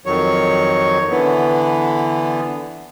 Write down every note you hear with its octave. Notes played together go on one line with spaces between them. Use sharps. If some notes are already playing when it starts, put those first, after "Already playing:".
F2 D#3 F#3 C#5
D3 E3 B3